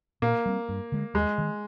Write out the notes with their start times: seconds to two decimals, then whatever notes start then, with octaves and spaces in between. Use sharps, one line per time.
0.22 A#2 A#3
0.46 G3 C4
0.69 G2
0.92 D3 G#3
1.14 D#2 G#3
1.38 D#3 G#3